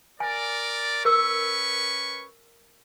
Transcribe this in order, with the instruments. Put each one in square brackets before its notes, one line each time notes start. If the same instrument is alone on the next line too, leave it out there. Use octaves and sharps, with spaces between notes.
[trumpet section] A#4 D5 [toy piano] G#5
[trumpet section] C#4 B4 C#6 [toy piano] A#4 E6